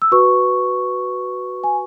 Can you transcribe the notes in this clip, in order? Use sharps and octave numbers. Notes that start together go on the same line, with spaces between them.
E6
F#4 B4 C#6
G#5